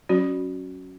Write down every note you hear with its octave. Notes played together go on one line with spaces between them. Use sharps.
F#3 C#4 F#4